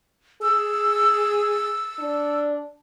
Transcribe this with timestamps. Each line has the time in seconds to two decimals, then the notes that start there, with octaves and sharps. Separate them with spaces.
0.42 G#4 E6
1.99 D4